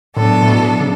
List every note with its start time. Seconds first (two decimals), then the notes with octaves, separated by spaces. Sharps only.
0.16 A2 F#3 B3 D4 A4
0.43 A2
0.48 B2
0.81 C#3